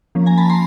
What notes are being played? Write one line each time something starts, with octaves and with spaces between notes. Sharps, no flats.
F3 A#3 C#4
G#5 A#5
A5 B5
A#5 C6